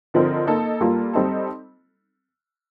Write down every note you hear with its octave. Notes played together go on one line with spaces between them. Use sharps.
D3 F3 C4 D#4 A#4
A#3 D#4 A4
G3 A#3 F4 A4
G3 C4 D#4 A4